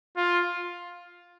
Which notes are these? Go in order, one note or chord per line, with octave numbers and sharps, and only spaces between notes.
F4